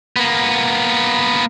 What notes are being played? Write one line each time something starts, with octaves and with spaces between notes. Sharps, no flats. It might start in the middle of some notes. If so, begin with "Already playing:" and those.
A#3 B3